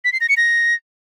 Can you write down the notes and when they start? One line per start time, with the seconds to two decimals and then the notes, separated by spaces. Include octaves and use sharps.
0.04 B6
0.13 C7
0.21 A#6
0.29 C#7
0.37 A#6